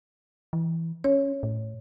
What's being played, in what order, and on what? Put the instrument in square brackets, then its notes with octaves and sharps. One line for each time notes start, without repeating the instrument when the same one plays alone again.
[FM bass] E3
[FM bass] C#4 [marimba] C#5
[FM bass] A2